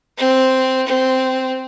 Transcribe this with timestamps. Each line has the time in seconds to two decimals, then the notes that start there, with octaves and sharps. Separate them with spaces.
0.17 C4
0.87 C4